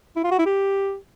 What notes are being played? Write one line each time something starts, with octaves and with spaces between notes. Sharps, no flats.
E4
F4
F#4
E4
G4